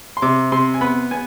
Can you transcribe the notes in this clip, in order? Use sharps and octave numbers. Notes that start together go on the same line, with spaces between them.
C6
C3 D6
C3 C6
G#5
B3 B5
B3 G#5